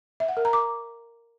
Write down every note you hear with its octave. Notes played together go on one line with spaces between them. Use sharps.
E5
F#5
A#4
A#5
D6